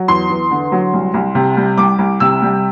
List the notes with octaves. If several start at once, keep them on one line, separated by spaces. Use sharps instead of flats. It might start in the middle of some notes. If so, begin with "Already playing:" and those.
Already playing: F#3
E2 C6
E2
D3
F#3
C2
C2
C3
G3
C2 D6
C2
C3 E6
G3